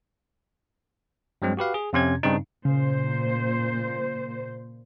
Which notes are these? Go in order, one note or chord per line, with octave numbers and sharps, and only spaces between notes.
G2 F#3 G#3 C4
F#4 G4 B4 F5
G#4
F2 C3 C#4 G#6
G2 C#3 C4 D4 D#4
A#2 C#3 C5